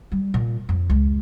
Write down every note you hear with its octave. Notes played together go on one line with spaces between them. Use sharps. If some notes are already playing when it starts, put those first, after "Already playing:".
G3
A#2
F2
C#2